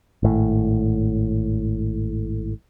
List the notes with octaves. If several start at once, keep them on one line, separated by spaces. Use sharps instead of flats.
G#1 A2